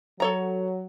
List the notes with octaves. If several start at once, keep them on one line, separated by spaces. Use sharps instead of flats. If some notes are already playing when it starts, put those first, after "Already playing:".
F#3 A4 C#5 A#5